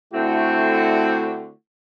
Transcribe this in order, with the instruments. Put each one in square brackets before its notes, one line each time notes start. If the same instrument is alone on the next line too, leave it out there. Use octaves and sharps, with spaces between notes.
[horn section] D3 C4 [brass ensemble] A3 E4 F#4